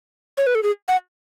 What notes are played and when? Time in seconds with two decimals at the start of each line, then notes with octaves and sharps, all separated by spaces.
0.38 C#5
0.47 B4
0.55 A4
0.63 G#4
0.88 F#5